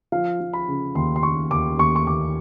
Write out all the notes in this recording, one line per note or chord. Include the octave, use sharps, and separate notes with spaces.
F3 F5
F3
B5
C#3
D#2 C6
C6
D#2 C#6
D#2 D6
D#2 C#6
C#6
D#2 D6